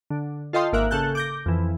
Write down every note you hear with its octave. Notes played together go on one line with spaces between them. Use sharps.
D3
F4 A4 D#5 F5 G5 C6
G#1 A#3 A#4 E5 F#6
C#3 A4 A5 F#6 G6
D6 G6 A#6
F2 E3